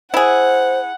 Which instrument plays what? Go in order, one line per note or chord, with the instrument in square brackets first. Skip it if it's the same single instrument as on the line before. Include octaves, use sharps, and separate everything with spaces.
[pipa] E4 G#4 [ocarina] C5 [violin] F#5